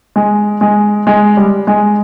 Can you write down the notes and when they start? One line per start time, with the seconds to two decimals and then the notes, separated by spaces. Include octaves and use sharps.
0.16 G#3
0.61 G#3
1.07 G#3
1.37 G3
1.67 G#3